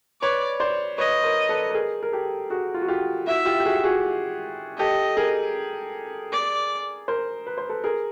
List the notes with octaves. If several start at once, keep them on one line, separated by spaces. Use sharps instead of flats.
B4 C#5 D5
C5 D5
B4 C#5 D#5
A#4 C5
A4 B4
B4
G#4 A#4
A#4
G4 A4
F#4 G#4
F4
F#4
F4 G4
E4 F#4 E5
F4 G4
G4
F#4 G#4
F#4 G#4
G4 A4 D#5
G#4 A#4
D5
A#4 C5
B4
C5
A4 B4
G#4 A#4